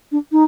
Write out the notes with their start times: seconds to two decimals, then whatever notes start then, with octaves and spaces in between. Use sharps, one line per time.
0.12 D4
0.32 D#4